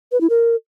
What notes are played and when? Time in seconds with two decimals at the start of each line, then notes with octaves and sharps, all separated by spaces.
0.12 B4
0.21 E4
0.30 A#4